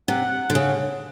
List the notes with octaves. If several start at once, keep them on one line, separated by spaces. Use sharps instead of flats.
C3 F#5
D3
C#3